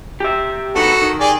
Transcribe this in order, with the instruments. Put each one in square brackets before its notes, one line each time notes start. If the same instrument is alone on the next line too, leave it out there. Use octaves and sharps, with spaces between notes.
[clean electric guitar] G4 E5
[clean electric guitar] D3 D#3 B3 [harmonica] F#4 A4
[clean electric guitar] D#3
[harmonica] G4 G#4 D5